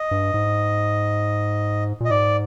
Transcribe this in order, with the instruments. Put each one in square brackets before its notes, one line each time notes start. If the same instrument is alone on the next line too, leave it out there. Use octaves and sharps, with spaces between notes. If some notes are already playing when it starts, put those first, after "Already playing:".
Already playing: [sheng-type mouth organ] D#5
[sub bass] G2
G#2
A#2
[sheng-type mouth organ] D#5
[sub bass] G#2 [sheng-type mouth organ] D5